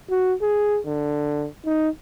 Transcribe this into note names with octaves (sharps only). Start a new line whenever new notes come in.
F#4
G#4
D3
D#4